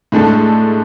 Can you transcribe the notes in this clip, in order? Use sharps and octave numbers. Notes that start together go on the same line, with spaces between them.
A2 G#3 D4 A4